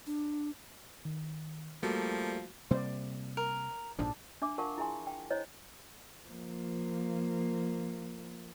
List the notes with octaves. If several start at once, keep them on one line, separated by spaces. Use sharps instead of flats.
D4
D#3
F3 G3 A3 A#3 F#4
C3 G3 A#3 C5 D5
A#4
A#1 G#2 F3 D4
D4 E5 D6
F4 A#4 F5 F#5 A5 C#6
E4 G#4 E5 G#5 C6
G5
E4 C5 C#5 D#5
F3 A#3